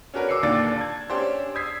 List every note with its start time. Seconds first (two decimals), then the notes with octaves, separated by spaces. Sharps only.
0.14 C#4 D4 F#4 A#4 B4
0.29 D6 E6 C7 C#7
0.43 D#2 A#2 D3 D4 D5 A6
0.78 A5 G#6
1.10 C#4 D4 G4 C5
1.55 D#6 E6 G#6 B6 C7